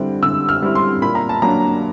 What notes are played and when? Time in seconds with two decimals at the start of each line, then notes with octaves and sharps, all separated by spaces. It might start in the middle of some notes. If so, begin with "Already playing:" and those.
Already playing: D3 G3 C4 E4
0.23 D3 E6
0.49 F6
0.62 G3 C4 E4
0.75 C6
1.02 A#2 B5
1.15 A#5
1.29 A5
1.42 F#3 A#3 D4 A#5